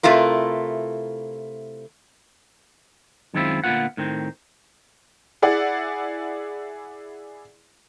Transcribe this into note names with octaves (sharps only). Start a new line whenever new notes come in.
C3 A3 E4 F4 A#4
F#2 D#3 G#3 C4 E4 F4
D2 A#2 F#3 B3 F4 F#5
A2 D#3 C4
E4 G#4 D5 F#5